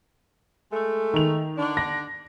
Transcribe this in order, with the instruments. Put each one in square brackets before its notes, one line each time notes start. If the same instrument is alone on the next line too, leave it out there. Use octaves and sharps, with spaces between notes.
[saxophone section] G#3 A3
[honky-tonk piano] D#3 F7
[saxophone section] D3 D4
[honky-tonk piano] A#6